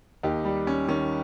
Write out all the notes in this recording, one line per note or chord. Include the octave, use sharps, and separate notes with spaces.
D#2 D#4 G4
G3
C#4
D#3 C#4